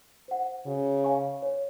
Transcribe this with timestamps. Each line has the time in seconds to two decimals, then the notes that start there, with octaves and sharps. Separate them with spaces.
0.28 C5 F#5
0.66 C#3 F#4
1.04 C#5 F5 G#5 C#6
1.42 C#5